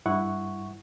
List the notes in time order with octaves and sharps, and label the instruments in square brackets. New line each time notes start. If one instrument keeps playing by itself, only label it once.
[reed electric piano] G2 E4 F#5 C#6